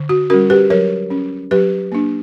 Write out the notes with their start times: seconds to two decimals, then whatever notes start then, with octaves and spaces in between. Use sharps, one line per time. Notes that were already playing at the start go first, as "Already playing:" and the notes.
Already playing: D3
0.09 F#4
0.30 G3 C#4 F#4 A#4
0.50 G4 B4
0.70 F#3 A#4 C#5
1.10 C#4
1.51 F#3 G4 B4
1.92 A#3 D4